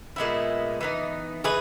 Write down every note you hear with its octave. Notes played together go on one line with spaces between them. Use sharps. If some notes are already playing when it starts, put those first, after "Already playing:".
A#2 G#3 B3 E4
E3 B3 D#4
E3 G#3 G#4 B4